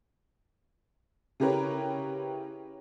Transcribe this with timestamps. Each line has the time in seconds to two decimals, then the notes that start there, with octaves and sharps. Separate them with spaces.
1.40 C#3 E4 G4 A#4 B4 C#5